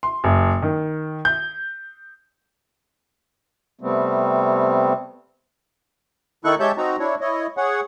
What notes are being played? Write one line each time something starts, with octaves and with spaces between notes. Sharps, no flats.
C6
F#1
D#3
G6
C3 G3 A3 B3 C4
D#3 D#4 E4 A4 C#6 F#6
G#3 G4 C#5 E5 A5 G6
C4 D#4 F#4 A#5
D4 E4 C#5
E4 C#5 D#5
G#4 C#5 F#5